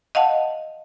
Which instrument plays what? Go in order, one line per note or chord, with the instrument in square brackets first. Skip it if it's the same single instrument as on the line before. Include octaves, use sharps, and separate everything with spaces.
[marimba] D#5 F5 F#5 A5